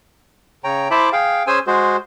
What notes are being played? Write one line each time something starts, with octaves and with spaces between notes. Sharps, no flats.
C#3 C#5 G5 A#5
E4 C5 E5 A5 B5 D6
G#4 F5 G5
C#4 G#4 C5 G#5 E6
G#3 F#4 G#4 C5